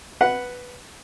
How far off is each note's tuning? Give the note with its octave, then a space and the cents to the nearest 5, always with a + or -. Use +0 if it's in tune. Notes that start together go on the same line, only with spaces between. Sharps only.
B4 +0 F#5 +0